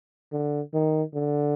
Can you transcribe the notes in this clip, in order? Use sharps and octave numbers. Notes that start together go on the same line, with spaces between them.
D3
D#3
D3